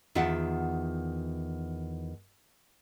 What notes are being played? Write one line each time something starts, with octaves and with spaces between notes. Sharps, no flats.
E2 D#3 F4 E5 F#5